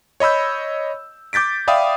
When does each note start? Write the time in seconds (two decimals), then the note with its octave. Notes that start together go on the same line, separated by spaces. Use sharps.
0.20 C#5 D#5 B5 E6 G6
1.33 D6 G6 A6 B6 D7
1.68 D5 E5 F5 G5 B5 D#6